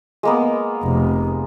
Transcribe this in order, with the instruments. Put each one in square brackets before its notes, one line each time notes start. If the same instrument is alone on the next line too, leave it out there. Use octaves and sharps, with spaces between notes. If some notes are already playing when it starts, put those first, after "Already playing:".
[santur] G#3 A#3 B3
[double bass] F1